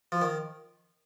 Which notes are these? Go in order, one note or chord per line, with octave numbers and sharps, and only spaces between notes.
F3
D#3